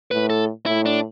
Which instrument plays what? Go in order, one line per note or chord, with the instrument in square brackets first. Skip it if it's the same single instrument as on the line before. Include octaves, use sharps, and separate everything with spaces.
[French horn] A2 [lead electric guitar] B4
[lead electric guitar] A4
[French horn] A2 [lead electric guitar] E4
[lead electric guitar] D4